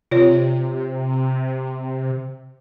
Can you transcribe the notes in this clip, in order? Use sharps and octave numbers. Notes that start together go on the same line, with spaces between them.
C3 F4 C#5 D5